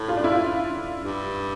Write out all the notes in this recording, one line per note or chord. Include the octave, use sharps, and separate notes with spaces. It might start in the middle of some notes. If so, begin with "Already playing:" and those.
Already playing: A2
F4
D4
E4
F4
G2